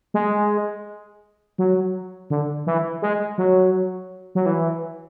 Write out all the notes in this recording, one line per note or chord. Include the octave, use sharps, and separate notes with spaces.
G#3
F#3
D3
E3
G#3
F#3
F#3
E3